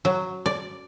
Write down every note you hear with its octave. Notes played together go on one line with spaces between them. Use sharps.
F#3
D5